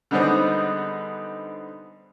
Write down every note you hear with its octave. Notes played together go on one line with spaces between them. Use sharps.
D3 G3 G#3 B3 C4 D#4